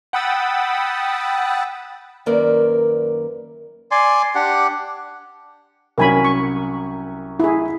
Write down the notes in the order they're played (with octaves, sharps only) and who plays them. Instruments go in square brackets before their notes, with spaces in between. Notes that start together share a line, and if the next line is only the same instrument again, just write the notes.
[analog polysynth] F#5 G5 B5 D#6 E6 A6
[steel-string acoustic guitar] F#2 D#3 A#3 A#4 B4 D5
[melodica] D5 G#5 C6
D4 G4 F#5
[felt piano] C2 F#3 C#4 [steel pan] A#4 G#5 B5
[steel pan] C#6
E4 G#4